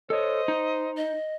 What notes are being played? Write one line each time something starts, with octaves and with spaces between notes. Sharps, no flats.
A4 C5 C#5 D#5
D#4
D#5